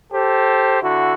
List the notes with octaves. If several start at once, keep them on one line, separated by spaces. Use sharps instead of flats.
G4 A4 C5
D3 E4 F#4